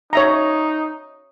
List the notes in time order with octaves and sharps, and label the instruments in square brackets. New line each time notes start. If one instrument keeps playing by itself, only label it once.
[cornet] D#4 [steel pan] C#5 E5 A#5